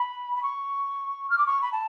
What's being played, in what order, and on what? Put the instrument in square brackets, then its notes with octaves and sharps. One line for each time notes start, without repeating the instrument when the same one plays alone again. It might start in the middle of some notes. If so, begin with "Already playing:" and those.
Already playing: [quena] B5
B5
C#6
F6
D6
C#6
B5
A5